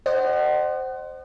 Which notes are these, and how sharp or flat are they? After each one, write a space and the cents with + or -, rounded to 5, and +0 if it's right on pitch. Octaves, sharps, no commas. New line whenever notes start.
C5 +0 D#5 -40 F#5 +30